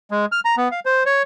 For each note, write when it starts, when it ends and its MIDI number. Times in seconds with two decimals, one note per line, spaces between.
0.11 0.25 56
0.32 0.40 89
0.45 0.55 82
0.57 0.68 59
0.71 0.80 77
0.85 1.03 72
1.06 1.22 73